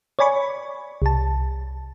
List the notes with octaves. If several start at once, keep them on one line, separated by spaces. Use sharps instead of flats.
C#5 D5 G#5 B5 C#6
C2 A5